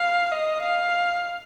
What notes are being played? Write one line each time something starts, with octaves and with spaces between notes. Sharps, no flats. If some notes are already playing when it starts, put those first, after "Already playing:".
Already playing: F5
D#5
F5